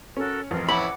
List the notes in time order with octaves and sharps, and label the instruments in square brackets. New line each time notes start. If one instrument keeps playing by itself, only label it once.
[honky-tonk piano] C#4 [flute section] F#4 A4 A#4
[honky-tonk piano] A1 F2 [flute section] F4 A#4
[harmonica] C#4 E4 [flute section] F#5 D6 [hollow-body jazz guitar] B5